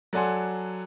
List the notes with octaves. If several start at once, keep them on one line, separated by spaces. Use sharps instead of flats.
F#3 A4 D5 F#5 G#5 C6